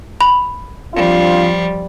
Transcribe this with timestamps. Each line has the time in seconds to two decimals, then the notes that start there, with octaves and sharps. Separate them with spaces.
0.21 B5
0.94 F3 G3 C4 D4 F4